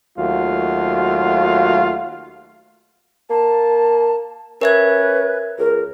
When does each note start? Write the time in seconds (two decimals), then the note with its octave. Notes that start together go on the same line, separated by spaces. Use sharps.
0.18 D#2 F#3 A3 F4 F#4
3.30 A#3 A5
4.61 C#4 A#4 B4 E5 G#6
5.59 C#2 A#4